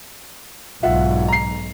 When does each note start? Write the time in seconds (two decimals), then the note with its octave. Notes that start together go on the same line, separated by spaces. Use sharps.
0.83 B1 G#2 F4 E5 F#5
1.28 A#5 C7